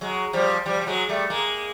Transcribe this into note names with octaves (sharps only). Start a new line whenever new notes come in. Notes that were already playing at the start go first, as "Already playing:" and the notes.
F#3 G#3
F3 G3
F3 G3
G3
F#3 G#3
G3 A3
G#3 A#3